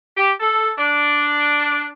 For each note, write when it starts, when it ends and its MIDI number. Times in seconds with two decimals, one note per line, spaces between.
0.17 0.32 67
0.40 0.71 69
0.78 1.89 62